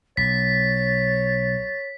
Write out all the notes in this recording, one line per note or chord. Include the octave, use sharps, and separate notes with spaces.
B1 C#5 A6 B6